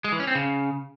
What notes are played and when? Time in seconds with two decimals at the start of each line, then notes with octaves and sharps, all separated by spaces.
0.04 G#3
0.12 E3
0.20 C#4
0.27 C4
0.35 C#3